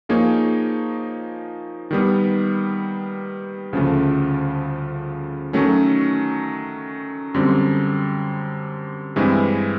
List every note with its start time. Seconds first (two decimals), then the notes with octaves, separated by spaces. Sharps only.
0.09 F3 A#3 D#4 G#4 C#5
1.91 D#3 G3 B3
3.73 D2 C#3 F3 A3
5.53 D#3 F#3 A3 C#4
7.34 F#2 D3 G3 C4
9.16 G2 E3 G#3 C4 E4